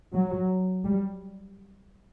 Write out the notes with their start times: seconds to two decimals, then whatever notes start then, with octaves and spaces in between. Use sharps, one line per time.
0.13 F#3
0.84 G3